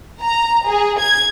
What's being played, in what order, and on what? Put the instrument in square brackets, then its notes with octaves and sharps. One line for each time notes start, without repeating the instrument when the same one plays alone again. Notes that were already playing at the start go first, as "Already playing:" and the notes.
[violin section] A#5
G#4
G#6